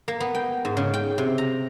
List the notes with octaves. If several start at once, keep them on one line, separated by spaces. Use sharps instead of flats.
A#3
B3
G5
G#2
C#3
G5
C3
A#5